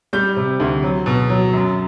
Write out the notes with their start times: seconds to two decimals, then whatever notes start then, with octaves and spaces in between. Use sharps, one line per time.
0.13 G3 G6
0.36 C3
0.60 D2
0.83 F#3
1.06 B2
1.30 F#3
1.53 F#2